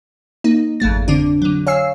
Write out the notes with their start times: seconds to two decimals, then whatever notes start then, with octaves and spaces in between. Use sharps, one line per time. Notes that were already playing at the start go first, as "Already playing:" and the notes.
0.44 A#3 D#4
0.80 G#1 F2 A3 A6
1.08 D3 C4 D4
1.42 D3 F#3
1.67 C#5 F5 G#5 E6 C7